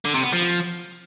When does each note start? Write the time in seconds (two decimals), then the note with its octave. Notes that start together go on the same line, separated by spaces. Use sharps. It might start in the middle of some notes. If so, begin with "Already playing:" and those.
0.05 D3
0.14 C3
0.23 B3
0.32 F3